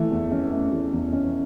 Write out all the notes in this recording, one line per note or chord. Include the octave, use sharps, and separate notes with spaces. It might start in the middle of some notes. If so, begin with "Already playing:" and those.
Already playing: E3 A3
E2
C#4
A3
E3
E2
C#4